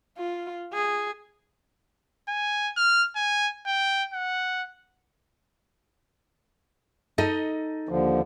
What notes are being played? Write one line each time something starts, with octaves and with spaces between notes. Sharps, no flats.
F4
G#4
G#5
F6
G#5
G5
F#5
D#4 A4 D#5
D#2 D3 F3